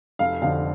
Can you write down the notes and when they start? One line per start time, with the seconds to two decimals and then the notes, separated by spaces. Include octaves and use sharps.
0.19 F1 F5
0.42 F2 D3 F5